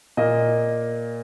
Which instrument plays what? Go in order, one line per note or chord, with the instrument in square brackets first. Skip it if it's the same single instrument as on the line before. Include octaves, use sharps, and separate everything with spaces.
[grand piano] A#2 A#3 D#5